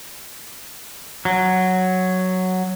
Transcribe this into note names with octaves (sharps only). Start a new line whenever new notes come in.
F#3